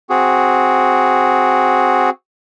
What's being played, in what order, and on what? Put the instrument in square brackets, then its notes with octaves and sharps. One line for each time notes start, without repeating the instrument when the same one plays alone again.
[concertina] C4 F#4 G#4